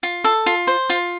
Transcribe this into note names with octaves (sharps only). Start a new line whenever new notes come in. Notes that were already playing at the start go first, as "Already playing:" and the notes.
F4
A4
F4
C5
F4